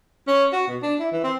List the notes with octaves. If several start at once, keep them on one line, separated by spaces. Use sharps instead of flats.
C#4
F#4
B2
D4
E4
E3
C4